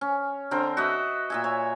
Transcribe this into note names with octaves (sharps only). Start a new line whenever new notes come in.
C#4
D3 C4 A#4
F#4 B4 D#5 E5
A#2 E5 G#5
C#5